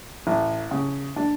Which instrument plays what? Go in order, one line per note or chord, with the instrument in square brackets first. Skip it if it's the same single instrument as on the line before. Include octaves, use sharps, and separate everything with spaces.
[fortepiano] A1
C#3
D4